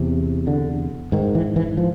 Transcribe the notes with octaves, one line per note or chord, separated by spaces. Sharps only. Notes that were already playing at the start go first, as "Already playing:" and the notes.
Already playing: E2 C3
D3
G#2 D#3
E3
E3
F3